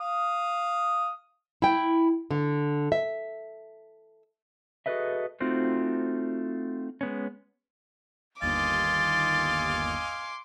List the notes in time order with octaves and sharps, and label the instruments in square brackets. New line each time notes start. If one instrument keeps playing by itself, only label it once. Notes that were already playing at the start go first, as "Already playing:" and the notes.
[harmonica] F5 D#6
[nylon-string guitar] E4 G5
D3
E5
[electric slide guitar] F#4 G#4 A4 B4 D#5 E5
A3 C4 D#4 F4 F#4 C5
G#3 B3 C#4
[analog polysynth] G1 D#2 [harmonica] D#5 F5 G#5 [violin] C6 D6 [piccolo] A6